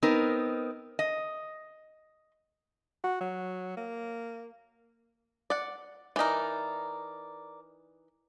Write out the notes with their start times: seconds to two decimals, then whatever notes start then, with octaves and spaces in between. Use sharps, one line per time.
0.03 B3 C4 D#4 A#4
0.99 D#5
3.04 F#4
3.21 F#3
3.77 A#3
5.50 D5 F#5
6.16 E3 D#4 A#4 D5